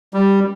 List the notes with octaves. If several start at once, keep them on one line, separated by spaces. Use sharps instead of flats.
G3